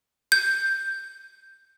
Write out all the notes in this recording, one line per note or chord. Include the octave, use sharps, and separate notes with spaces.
G6